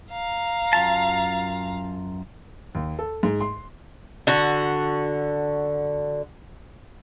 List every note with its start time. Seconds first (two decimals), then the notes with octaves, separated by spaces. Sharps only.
0.10 F5 A#5
0.73 F#2 F4 A5
2.75 D#2
2.99 A4
3.23 G#2
3.41 C6
4.27 D3 F#4